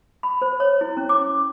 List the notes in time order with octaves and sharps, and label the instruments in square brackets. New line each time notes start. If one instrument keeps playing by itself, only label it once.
[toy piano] B5
C5
C#5
E4
C#4
D6